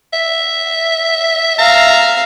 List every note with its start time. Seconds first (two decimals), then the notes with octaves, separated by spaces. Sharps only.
0.13 E5
1.58 E5 F5 A#5